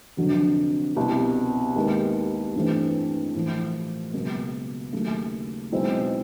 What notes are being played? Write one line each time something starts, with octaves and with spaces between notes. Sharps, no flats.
F1 F2 D3 F#3
C2 B2 G3
D#2 D#3 G#3 B3
A1 G2 E3 A3 C4
A1 A2 F3
C#2 B2 F#3 A#3
D#2 C#3 F#3 A3
B1 B2 G#3 C4 E4